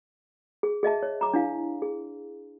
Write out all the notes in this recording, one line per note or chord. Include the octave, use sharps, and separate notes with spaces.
G#4
G#4 D#5 E5 A5
C#5
A#5 D6
D4 E4 F5 G#5
G#4